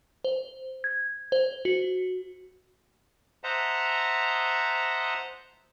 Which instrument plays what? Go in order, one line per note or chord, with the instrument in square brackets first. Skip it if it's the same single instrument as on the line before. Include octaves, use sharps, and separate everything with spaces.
[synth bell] C5
G#6
C5
F#4
[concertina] C5 D#5 E5 F#5 A5 A#5